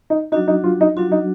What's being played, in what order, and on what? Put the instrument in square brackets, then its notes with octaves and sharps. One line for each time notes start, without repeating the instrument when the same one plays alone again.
[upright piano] D#4
[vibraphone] F#3 D4 F#4 [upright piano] D#4
[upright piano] D#4
F4
D#4
[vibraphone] F#3 D4 F#4 [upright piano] F4
[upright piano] D#4